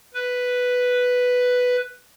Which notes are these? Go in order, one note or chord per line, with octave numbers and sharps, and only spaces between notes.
B4